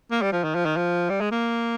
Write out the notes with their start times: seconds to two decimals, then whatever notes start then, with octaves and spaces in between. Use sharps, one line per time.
0.11 A#3
0.22 G3
0.33 F3
0.44 D#3
0.55 F3
0.66 D#3
0.77 F3
1.10 G3
1.21 G#3
1.32 A#3